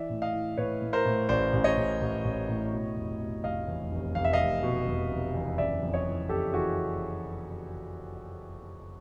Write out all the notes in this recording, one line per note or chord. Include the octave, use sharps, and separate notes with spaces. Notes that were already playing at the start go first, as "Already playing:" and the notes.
Already playing: E3 D5 E5
A2
D#5 F5
E3
A2 B4 C#5
A2
A#4 C5
A2
A1 C5 D5
A1
C#5 D#5
A1
A1
A1
A2
B2
F1
B2
F1 D#5 F5
E2
F1
F1 F5
E5
D#5 F5
F1
B2
F1
F1
E2
F#1 D5 E5
F2
C#5 D#5
E3
F#1 G4 A4
E3 F#4 G#4